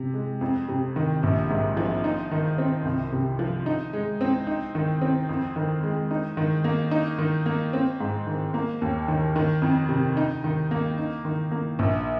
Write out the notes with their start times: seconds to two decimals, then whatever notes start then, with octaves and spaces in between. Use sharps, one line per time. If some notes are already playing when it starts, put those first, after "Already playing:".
Already playing: C3
0.14 G#3
0.41 F2
0.68 C3
0.96 D#3
1.23 A#1
1.50 G#2
1.77 F3
2.04 D#4
2.31 D#3
2.58 C4
2.85 C2
3.12 C3
3.39 F3
3.66 D#4
3.93 G#3
4.21 C4
4.47 D#4
4.75 D#3
5.02 C4
5.29 F2
5.56 D#3
5.83 G#3
6.11 D#4
6.37 D#3
6.64 A#3
6.91 D#4
7.18 D#3
7.46 A#3
7.73 C4
8.00 G#2
8.27 D#3
8.54 A#3
8.82 D#2
9.08 D#3
9.36 D#3
9.62 F2
9.89 C3
10.17 D#4
10.44 D#3
10.71 A#3
10.98 D#4
11.25 D#3
11.52 A#3
11.79 A#1